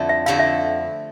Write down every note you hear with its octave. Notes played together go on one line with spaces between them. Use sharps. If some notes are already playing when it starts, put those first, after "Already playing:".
Already playing: F2 D3 A3 D4 E4
E5
F2 D3 A3 E4 F5
E5